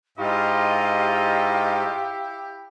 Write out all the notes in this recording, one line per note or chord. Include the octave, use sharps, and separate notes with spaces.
G#2 E4 F4 G4 D#5 F5